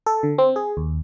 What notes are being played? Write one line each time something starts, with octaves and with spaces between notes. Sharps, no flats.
A4
D3
C4
G#4
D#2